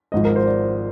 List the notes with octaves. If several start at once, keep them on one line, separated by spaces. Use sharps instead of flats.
G#1 G#2 F3 D#5
A#4
C5
D5